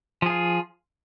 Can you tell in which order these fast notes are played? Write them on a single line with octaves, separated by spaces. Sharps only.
F3 G#4 F4